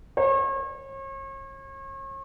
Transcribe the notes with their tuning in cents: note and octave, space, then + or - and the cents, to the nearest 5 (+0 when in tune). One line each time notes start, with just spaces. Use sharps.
C#5 -40